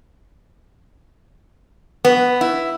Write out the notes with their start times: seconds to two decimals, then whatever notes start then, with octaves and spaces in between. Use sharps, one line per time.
2.05 B3
2.41 E4